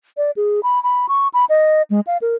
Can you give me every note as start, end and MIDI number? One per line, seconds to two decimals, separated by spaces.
0.17 0.31 74
0.36 0.60 68
0.63 0.82 83
0.83 1.06 83
1.09 1.28 85
1.34 1.45 83
1.49 1.82 75
1.90 2.01 56
2.07 2.17 77
2.22 2.36 70